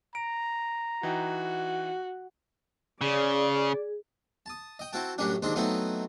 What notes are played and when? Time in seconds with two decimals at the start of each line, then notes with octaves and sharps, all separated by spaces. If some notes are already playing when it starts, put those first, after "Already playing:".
0.15 A#5 D7
1.03 E3 D#4 F#4 G5
3.01 C#3 G#4 D5
4.46 A5 D#6
4.79 D#5 G5
4.93 C4 E4 F#4 G5 A5
5.18 F#2 A2 G3 C#4 D4 F#4
5.42 D#2 G#3 C4 D4 C6
5.56 F#3 A3 B3 C4 D#4 E4